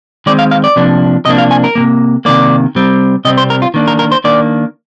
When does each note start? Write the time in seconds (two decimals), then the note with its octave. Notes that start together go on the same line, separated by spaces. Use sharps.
0.26 D#3 G#3 C4 D5
0.39 F5
0.51 F5
0.64 D5
0.76 C3 F3 A#3 D4
1.25 C3 F3 A#3 D4 D#5
1.38 F5
1.51 G#5
1.64 A#4
1.75 C3 D#3 A#3
2.25 C3 D#3 A#3 D5
2.75 C3 G3 C4
3.25 C3 G3 C4 D#5
3.37 C5
3.50 A#4
3.62 F4
3.74 D#3 A#3 D4
3.88 A#4
3.99 A#4
4.12 C5
4.24 D#3 A#3 D4 D5